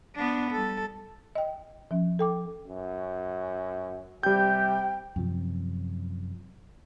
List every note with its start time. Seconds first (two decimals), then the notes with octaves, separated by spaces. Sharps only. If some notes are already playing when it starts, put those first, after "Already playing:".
0.15 B3 D4
0.51 G3 A4
1.35 D#5 G5
1.91 F3 C#4
2.19 A4 G5 D6
2.67 F#2
4.23 C3 G3 G4 G5 G6
5.16 F#2 C3 F3